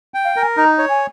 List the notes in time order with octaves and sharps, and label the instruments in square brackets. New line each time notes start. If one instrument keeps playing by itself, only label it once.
[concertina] G5
[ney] F5
[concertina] A#4
[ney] G#5
[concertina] D#4 [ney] A#5
[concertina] C#5
[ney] G#5